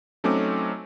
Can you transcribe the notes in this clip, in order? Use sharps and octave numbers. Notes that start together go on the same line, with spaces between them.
F#3 A3 C4 C#4 D#4 D6